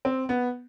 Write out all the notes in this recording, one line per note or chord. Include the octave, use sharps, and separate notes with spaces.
C4
B3